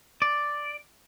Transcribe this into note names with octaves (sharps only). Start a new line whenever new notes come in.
D5